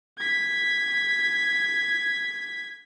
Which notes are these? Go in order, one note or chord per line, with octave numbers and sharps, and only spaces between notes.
G#6 B6